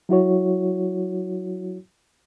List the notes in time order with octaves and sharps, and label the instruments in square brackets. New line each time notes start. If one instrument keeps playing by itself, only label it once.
[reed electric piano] F#3 E4 F#4 C#5